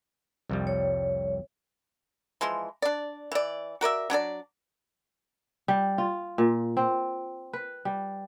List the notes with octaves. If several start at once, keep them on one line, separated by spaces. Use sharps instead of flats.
C2 F2 G3
C#5
E3 F3 G#3 C6
D4 D5
E3 D5
F#4 A#4 D5 E5
F#3 D4 G#4 D5
G3
F4
A#2
C4
B4
G3